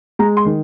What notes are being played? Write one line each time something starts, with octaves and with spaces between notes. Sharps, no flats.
G#3 A#5
C6
D#3